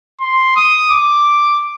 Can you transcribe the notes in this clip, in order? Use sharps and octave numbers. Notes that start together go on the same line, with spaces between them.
C6
D#6
D6